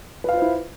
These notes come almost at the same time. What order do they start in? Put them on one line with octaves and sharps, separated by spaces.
B4 F5 F4 C5 E4